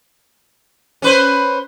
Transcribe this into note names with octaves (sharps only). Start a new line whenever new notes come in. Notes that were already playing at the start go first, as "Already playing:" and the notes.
C#4 B4 C5